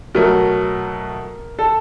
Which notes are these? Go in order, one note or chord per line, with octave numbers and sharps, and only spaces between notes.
B2 F#3 A3 A#4
A4